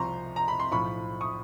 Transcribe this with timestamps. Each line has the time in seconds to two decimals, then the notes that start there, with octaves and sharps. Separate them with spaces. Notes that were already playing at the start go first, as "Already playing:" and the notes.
Already playing: C2 C3 F3 A#5 C6 C#6
0.36 A#5
0.48 B5
0.60 C6
0.71 B1 A2 F3 B5 C#6
1.21 C#6 D#6